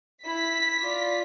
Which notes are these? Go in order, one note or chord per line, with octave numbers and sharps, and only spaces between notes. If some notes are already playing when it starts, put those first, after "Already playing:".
E4 B6
F4 D5